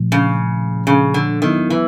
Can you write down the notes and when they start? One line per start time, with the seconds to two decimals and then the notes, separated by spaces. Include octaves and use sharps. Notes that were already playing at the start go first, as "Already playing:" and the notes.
Already playing: A#2 F3 A3
0.12 C#3
0.87 C#3
1.14 D3
1.42 D#3 F#3 B3 E4
1.70 E3